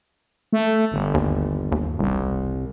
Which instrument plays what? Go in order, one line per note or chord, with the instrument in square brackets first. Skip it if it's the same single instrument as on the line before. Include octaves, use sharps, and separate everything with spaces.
[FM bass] A3
G1
[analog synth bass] D#2
D#2
[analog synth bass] E1 [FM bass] C2